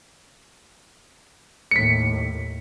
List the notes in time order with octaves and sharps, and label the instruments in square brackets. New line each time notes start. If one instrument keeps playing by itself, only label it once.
[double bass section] D#2 A2 [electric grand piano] B6 C#7